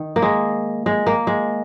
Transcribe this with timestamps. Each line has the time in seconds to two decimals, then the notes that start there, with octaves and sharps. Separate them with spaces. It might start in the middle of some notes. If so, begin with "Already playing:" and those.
Already playing: D#3
0.16 A#3
0.22 G#3
0.86 G#3
1.07 A#3
1.27 G#3